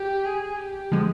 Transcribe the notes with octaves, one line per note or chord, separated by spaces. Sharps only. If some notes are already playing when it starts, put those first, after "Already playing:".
Already playing: G4
G#4
G4
D3 F3 G#3